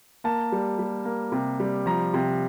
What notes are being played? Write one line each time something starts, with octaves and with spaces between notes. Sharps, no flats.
A#3 A5
G3
G3
A#3
C3
G3
F3 A#5
C3